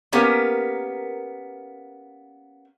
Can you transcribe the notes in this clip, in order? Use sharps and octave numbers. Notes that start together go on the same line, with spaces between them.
A#3 B3 C#4 G4 A#4